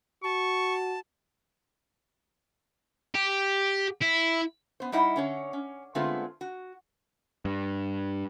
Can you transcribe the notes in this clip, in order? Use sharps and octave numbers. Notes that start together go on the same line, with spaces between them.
F#4 A5 C#6
G4
E4
B3 C5
G3 D#4 E4 D#5 F#5
D3 C#4 C#5
C#4
D3 G#3 A3 B3 C4 F4
F#4
G2